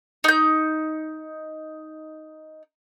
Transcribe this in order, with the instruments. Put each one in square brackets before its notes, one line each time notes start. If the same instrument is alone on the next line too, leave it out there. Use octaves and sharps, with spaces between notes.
[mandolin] D#4 G6